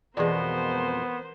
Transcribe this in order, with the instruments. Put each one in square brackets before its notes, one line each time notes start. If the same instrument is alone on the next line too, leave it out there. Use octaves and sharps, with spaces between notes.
[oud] F2 B2 G#3 [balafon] E3 D5 [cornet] B3 [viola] A#4 C5